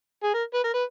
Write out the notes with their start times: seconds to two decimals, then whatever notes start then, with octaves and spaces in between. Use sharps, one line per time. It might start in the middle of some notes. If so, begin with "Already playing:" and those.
0.23 G#4
0.34 A#4
0.54 B4
0.64 A#4
0.74 B4